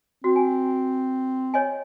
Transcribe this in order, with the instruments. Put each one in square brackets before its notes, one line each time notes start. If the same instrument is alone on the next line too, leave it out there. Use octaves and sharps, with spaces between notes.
[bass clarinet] C4 [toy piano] F#4
[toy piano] G#5
C#5 D#5 G#5